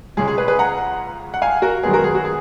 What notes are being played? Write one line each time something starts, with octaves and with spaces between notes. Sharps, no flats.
C#2 C#3 G#3 G#4
G#4
G#4 B4
G#4 B4
F#5 A#5
F#5
F5 G#5
F#4 A#4
F#2 D#3 G#3 B3 G#4
F#4 A#4
G#4
F#4
G#4